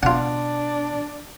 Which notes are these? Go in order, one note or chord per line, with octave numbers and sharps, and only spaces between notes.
B2 D4 F4 F#5